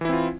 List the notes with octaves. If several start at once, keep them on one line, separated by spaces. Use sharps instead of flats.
E3 C4 E4 F4